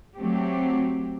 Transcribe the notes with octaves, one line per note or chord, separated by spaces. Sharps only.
F#3 A3 C4 G4